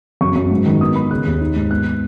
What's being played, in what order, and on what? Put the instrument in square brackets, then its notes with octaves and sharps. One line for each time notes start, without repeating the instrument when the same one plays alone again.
[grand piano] F#2 C#6
F#2
G#2
D#3
B3 D#6
B3 B5
C#3 F#6
D#2
D#4
G#2
B3 F#6